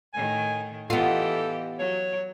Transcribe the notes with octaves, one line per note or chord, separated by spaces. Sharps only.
A2 D#3 G#5
E3 B3 F4 G4 A4 D#5
F#3 C#5